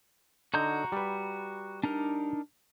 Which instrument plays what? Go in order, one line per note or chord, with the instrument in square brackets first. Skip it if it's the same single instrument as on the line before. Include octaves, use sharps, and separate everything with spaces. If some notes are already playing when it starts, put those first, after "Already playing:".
[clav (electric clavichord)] D3 D#4 [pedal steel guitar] F#4 A#5 G6
[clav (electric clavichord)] G3 B4
[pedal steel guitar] D4 D#4 A#4